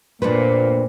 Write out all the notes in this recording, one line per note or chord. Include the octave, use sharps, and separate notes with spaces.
F2 A#2 A3 C4 D4 B4